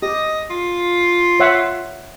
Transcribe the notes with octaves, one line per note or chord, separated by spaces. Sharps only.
G4 D#5
F4
C#5 E5 F#5